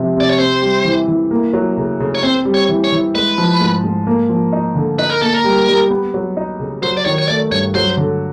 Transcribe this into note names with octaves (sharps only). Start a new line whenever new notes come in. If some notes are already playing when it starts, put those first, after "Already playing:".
Already playing: C3 F3 G#3
C3 D5
C#5
C4 C5
G3
E3
E3
A#3
F#3
C#3
C#3
C#5
C4 C5
G3
C#5
E3
C#5
E3
G#3 B4
F3
G#2
G#2
A#3
F3
D#4
D3
D#4 B4
A#4
A#3 A4
A#4
G3
G3
B3
F#3
D#4
C#3
F#3 C5
D5
D#3 C#5
C#5
A3 D5
G2 C#5
F#3 C5
D3